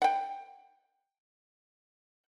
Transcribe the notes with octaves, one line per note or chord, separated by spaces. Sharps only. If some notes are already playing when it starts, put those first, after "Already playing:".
F#5 G5